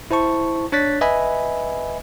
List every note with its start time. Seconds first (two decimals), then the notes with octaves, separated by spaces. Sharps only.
0.11 E4 C5 A5 C#6
0.72 D4 C#5 F#6 A6 B6
1.01 B4 D#5 E5 G#5 B5